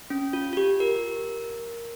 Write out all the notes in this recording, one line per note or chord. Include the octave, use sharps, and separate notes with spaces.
C#4
F4
F4
G4
A#4